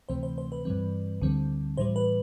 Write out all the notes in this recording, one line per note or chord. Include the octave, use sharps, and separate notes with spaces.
D2 C3 E3 A3 C4 C5
C5
C5
B4
G2 E3 G3 C4
D2 D3 G3 C4
A2 E3 G3 C5
B4